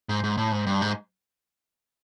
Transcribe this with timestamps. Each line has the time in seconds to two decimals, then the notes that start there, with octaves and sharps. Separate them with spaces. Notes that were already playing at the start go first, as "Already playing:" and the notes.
0.09 G#2
0.24 G#2
0.37 A2
0.52 G#2
0.67 G2
0.82 G#2